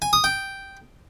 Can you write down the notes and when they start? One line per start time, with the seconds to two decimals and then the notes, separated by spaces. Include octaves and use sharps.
0.02 G#5
0.13 D#6
0.24 G5